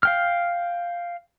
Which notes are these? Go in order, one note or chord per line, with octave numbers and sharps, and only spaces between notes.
F5 G5 F6